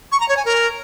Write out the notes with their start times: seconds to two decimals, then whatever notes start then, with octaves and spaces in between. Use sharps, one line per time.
0.12 C#6
0.20 A#5
0.29 C#5
0.37 G#5
0.45 A#4